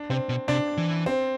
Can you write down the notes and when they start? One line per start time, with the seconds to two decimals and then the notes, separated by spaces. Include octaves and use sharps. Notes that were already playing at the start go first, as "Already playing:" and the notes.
Already playing: D4
0.10 C3 C4
0.29 B2
0.48 C3 D4
0.78 E3
1.06 C4